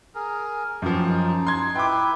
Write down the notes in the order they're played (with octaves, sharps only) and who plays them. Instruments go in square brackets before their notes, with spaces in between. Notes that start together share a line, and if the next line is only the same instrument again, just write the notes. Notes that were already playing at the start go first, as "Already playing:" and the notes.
[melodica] G#4 A#4
[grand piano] F#2 F3 [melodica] G4 C#6
[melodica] D#4
[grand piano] C6 G#6
[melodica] E4 B4 [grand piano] G5 D6